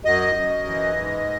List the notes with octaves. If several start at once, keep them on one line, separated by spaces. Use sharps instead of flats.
F#2 D#5
F#2
E3
G#2